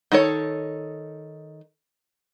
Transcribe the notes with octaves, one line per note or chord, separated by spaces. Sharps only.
D#3 D#4 A4 C#5